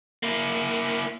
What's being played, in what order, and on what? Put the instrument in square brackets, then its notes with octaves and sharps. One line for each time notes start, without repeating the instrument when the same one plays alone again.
[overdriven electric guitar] A#3 E4